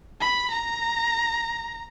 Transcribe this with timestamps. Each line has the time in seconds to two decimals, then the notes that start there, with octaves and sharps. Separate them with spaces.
0.21 B5
0.51 A#5